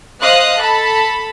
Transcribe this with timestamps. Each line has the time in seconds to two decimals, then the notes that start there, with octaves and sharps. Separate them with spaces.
0.21 C5 D#5 F5 D#6 F#6
0.60 A4 A5 B5